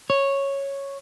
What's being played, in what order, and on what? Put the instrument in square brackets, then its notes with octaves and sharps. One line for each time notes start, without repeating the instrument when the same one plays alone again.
[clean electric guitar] C#5